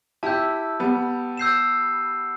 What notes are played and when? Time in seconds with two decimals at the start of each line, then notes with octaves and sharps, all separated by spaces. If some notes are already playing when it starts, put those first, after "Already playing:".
0.23 E4 G4 A5 E6 G6
0.80 G3 B3
1.37 E6 G6 C7 E7